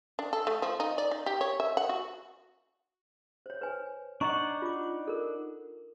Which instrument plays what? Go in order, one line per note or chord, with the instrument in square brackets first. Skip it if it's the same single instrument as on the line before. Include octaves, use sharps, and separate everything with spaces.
[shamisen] D4
A4
A3
F3
D#4
D5
D#4
G4
C#5
E5
F#5
F#4
[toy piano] C5 C#5
B4 C5 G#5
[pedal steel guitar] D4 D#4 F#5 [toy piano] D#5 A#5 C#6
[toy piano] F4 D6
A4 A#4